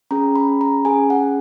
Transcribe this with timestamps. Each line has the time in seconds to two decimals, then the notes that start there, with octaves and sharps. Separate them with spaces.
0.11 C#4 G#4 A#5
0.36 B5
0.61 A#5
0.85 C#4 G#4 G#5
1.10 F#5